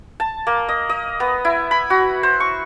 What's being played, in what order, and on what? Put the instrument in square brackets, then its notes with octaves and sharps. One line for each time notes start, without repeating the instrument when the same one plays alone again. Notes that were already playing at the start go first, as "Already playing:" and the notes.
[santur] A5
A#3
D#5
D#5
B3
E4
B5
F#4
C5
C#6